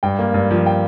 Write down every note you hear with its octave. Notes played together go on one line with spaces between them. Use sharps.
G2 G5
A#3
G2
F3
G5